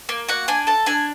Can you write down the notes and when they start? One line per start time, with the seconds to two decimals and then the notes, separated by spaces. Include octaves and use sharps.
0.09 A#3
0.28 F#4 F#5
0.48 D4 G#5
0.67 A4 A5
0.86 D4 G#5